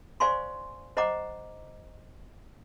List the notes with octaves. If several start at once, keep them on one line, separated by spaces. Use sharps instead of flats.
C5 D5 F5 G#5 C6 C#6
C5 D#5 F#5 A#5 D6